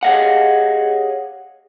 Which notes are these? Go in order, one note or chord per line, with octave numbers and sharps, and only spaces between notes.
G4 G#4 C#5 D#5 F5 F#5